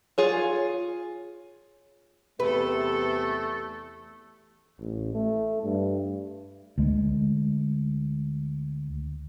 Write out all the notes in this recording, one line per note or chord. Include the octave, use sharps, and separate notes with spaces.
F4 G#4 C#5
E2 C3 A3 A4 B4
A1
A3
G2
D2 G#3